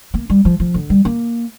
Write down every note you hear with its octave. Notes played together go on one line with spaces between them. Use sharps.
A#3
G3
F3
F3
D3
G3
A#3